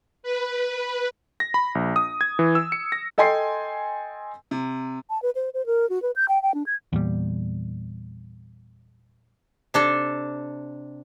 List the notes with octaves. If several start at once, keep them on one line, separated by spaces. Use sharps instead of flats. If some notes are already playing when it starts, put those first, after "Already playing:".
B4
A#6
B5
A#1
D#6
G#6
E3
E6
C#7
A#6
A4 D#5 G5 G#5 C6 C7
C3
A5
B4
C5
C5
A#4
F#4
B4
G6
G5
G5
D4
G#6
E2 A#2 G3
C3 D4 A4